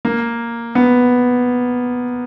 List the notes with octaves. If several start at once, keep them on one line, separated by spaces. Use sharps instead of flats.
A#3
B3